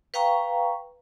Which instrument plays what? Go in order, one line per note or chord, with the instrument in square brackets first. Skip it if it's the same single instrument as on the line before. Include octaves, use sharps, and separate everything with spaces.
[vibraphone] B4 F5 G5 A#5 C#6